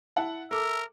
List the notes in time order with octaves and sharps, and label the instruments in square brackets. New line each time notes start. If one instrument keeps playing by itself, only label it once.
[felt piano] E4 F#5 A5
[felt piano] A4 D6 [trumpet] A#4 [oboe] E5